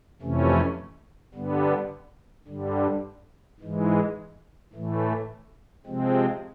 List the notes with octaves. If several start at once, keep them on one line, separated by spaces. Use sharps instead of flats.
F2 C3 E3 A3 C#4
G2 D3 G3 B3
G2 D3 G3
G#2 E3 G#3
A2 E3 A3
C3 F3 G#3 C4